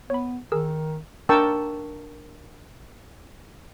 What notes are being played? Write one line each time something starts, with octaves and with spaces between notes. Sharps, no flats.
B3 C#5 B5
D#3 G#4 A#4 E6
D4 A#4 G5 A5 C#6 E6